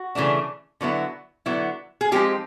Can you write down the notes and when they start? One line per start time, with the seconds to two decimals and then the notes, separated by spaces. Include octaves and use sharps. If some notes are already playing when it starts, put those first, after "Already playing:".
Already playing: F#4
0.15 C#3 E3 A3 D4
0.81 D3 F#3 B3 E4
1.46 D3 F#3 B3 E4
2.01 G#4
2.12 F3 G#3 C4 D#4 G4